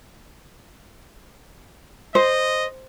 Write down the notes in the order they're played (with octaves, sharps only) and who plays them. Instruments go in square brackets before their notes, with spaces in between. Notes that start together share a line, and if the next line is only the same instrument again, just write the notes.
[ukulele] C5 [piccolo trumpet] D#5